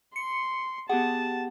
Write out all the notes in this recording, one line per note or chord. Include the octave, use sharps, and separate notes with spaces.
C6 C#7
B3 G4 G#4 F#5 A5